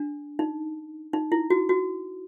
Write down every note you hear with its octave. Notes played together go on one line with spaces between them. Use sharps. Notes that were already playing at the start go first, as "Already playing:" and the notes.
Already playing: D4
D#4
D#4
E4
F#4
F#4